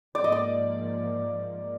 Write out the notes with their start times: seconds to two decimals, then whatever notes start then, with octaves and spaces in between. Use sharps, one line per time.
0.15 G#2 F3 A#3 D5
0.24 D#5
0.32 D5